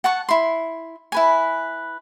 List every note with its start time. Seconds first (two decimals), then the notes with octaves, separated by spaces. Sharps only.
0.04 F#5 A5 C#6
0.29 E4 C6
1.12 E4 B4 G#5